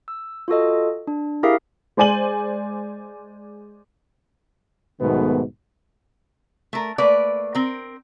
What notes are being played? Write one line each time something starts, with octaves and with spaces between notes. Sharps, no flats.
E6
F4 F#4 A4 D#5
D4
E4 G4 G#4 A#4 E5 F5
G#3 C5 D5 G#5 D#7 F#7
B1 G#2 B2 D#3 A3 B3
A3 A#4
A3 A#3 B4 D5
C4 A#4